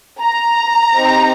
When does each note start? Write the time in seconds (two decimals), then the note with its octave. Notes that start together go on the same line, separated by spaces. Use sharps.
0.22 A#5
0.95 C4 D#4 G4